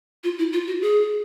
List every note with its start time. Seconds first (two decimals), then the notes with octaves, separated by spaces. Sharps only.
0.24 F4
0.38 E4
0.53 F4
0.67 F#4
0.82 G#4